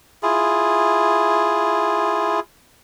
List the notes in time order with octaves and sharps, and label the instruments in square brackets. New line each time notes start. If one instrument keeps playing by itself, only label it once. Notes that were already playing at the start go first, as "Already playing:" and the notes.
[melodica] E4 F4 G#4